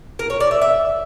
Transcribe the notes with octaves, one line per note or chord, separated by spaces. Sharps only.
A#4
C#5
D5
E5
E5